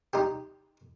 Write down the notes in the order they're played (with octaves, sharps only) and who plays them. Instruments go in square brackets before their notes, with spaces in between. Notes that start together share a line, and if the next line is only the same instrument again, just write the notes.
[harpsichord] D#4 G4